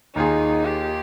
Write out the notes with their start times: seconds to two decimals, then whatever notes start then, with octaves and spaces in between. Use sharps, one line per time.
0.15 D#2 D#3 A#3 D#4 F4 G#4
0.65 G4